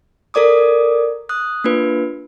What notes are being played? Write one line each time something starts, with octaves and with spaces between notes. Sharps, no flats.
A4 A#4 D5 D6 D#6
D#6 F#6
A#3 D4 F4 B4